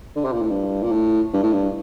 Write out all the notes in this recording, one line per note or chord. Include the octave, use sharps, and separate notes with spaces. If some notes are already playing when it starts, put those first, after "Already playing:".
D3
C3
A#2
A2
G2
A#2
A2
G2
A2
G2